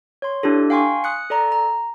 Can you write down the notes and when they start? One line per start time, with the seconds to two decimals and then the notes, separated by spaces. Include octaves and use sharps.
0.22 C#5 C6
0.43 D4 E4 G4 A4
0.70 F5 G5 G#5 C6 C#6
1.04 D#6 F#6 C#7
1.30 A4 D5 A#5
1.52 A#5